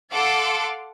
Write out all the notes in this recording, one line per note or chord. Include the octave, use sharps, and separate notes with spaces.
A4 F5 F#5 A5 C6 D6